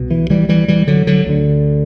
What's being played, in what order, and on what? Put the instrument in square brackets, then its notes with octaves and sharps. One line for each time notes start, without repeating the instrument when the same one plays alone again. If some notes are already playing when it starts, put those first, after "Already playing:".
Already playing: [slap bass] C2 B2
E3
E3 G3
E3 G3
E3 G3
D3 F#3
D3 F#3
D2 D3